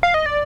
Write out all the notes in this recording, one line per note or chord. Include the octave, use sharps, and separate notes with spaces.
F5
D#5
D5